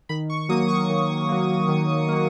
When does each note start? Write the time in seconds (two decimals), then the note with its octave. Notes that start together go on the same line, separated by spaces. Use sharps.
0.09 D#3 B5
0.30 C#6
0.49 F#3 A#3 D#6
0.69 C#6
0.89 D#3
1.29 F#3 A#3
1.68 D#3
2.09 F#3 A#3